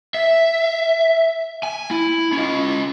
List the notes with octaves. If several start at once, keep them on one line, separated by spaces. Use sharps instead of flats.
E5
G#5
E4
C#4 F4